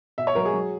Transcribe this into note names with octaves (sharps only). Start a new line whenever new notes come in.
B2 E5
C#5
F#3 A#4
G#4
F#3